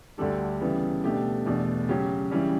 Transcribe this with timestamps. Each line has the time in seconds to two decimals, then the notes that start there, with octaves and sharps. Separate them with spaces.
0.18 D2 D3 G3 D4 A4
0.61 C#3 E3 G3 B3
1.04 B2 A3 D4 G4
1.46 E2 B2 A3 D4
1.89 C#3 F#3 C#4 G4
2.31 C#3 E3 G3 C#4